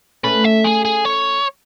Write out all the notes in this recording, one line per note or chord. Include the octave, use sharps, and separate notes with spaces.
A3 C#4 B4
E5
G#4
G#4
C#5